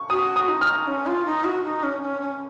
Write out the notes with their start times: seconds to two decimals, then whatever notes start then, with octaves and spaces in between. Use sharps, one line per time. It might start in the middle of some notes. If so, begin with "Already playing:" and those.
Already playing: C#6
0.10 F#4 D#6
0.36 D#6
0.49 D#4
0.61 F6
0.87 C#4
1.07 F4
1.26 D#4
1.45 F#4
1.64 D#4
1.83 C#4
2.02 C#4
2.22 C#4